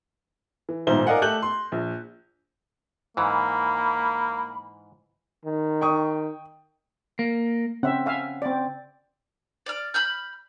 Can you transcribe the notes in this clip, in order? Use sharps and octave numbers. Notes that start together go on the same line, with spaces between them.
E3
D#1 B1 G#2 C5 E5 G7
A#4 D5 D#5 F5 F#5 G#5
A3 G4 A4 F#6 G6 F#7
C6
A#1
G#2 E3 A#3 B5
D#3
G5 C#6 D#6
A#3
C#3 C4 C#4 E5 F#5
E5 F5 G#5
C4 D5
D5 F6
B5 F6 G6